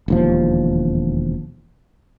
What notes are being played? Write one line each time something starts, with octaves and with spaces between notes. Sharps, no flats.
E1 D#2 F3